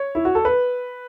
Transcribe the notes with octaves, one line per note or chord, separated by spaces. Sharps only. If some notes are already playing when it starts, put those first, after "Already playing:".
Already playing: C#5
E4
F#4
A4
B4